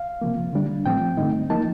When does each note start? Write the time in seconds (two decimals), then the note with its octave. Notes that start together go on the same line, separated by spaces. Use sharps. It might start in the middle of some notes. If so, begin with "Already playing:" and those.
Already playing: F5
0.22 C3 F3 A#3
0.53 D3 G3 D4
0.86 A2 F3 C4 G5
1.17 G2 D3 A3 C4 D#4
1.50 F3 A#3 D#4 A5